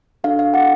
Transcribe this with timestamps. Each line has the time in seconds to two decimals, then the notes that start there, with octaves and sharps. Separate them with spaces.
0.24 D4 F#4 A4 F5
0.39 F5
0.54 D4 F#4 A4 F#5